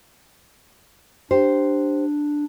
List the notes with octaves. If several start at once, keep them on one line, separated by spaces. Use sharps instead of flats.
D4 G4 C5